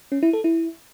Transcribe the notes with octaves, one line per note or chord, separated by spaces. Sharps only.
C#4
E4
A4
E4